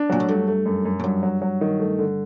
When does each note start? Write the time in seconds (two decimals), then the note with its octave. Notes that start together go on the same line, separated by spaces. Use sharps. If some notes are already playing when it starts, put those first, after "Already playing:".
Already playing: D4
0.10 A#2 F#3
0.20 A2
0.29 G2 A3
0.47 A3
0.66 F#2
0.85 F#2
1.00 A2
1.04 G2 F#3
1.23 F#3
1.42 F#3
1.61 D#3
1.80 A3
1.99 D3